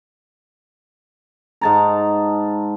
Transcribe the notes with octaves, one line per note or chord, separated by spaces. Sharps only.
G#2 A5 A#5